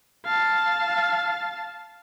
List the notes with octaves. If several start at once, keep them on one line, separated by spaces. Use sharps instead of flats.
F5 A5